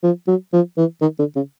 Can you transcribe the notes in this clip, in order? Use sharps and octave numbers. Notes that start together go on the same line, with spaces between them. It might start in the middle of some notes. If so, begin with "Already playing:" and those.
F3
F#3
F3
E3
D#3
D3
C#3